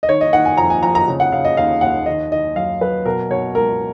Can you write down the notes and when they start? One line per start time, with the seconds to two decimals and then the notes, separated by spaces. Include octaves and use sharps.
0.03 D#5
0.09 D#3 C#5
0.21 D#5
0.33 D#3 F#5
0.45 G#5
0.57 F2 A#5
0.70 G#5
0.83 F2 A#5
0.95 A#5
1.08 C#3
1.20 F#5
1.32 C#3 F5
1.45 D#5
1.57 D#2 F5
1.81 D#2 F#5
2.06 D#3 D#5
2.31 D#3 D#5
2.56 F#2 F5
2.81 F#2 B4
3.05 B2 A#4
3.30 B2 C#5
3.55 C#2 A#4